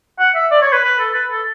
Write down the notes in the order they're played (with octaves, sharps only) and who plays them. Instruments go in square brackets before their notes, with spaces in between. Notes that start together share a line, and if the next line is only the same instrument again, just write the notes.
[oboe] F#5
E5
D5
C#5
B4
B4
A4
B4
A4